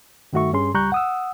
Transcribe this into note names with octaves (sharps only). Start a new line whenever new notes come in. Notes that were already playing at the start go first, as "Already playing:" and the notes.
G2 D#3 A3 F#4 E5 C#6
G2 C#4 G#4 C6
C#2 G3 A#5 C#6 F#6 G6
F#5 D#6 E6